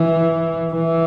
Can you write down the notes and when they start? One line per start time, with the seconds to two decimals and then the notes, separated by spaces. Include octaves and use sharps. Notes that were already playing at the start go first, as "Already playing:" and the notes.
Already playing: E3
0.73 E3